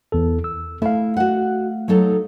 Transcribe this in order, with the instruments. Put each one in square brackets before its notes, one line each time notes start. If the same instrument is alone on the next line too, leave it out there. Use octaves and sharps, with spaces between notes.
[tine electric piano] E2 A4
E6
[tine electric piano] A3 F5 [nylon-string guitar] E4
[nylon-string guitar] F#4 F#5
F#3 D#4 A4